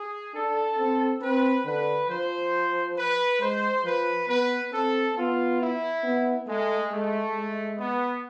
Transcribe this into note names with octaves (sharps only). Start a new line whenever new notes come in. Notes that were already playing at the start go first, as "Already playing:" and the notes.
Already playing: G#4
D4 A4
C4
C4 B4
D3 B4
F3 C5
B4
G#3 C5
F3 B4
B3 B4
C4 A4
B3 F4
E4
B3
G#3 A3
G#3 A3
G#3
B3